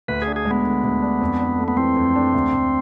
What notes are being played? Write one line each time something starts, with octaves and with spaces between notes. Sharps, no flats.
D2 B4
G#4
D4
G#4
G#3
B3
D3
D2
D4
F2
D4
A3
B3
E3 C4
F2
D4
D2
D2